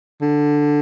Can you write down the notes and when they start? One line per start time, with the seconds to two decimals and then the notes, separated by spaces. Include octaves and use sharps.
0.22 D3